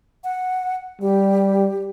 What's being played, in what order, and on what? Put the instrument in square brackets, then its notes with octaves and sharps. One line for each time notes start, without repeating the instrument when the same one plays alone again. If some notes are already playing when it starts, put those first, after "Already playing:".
[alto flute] F#5
[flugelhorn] G3 [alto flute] G4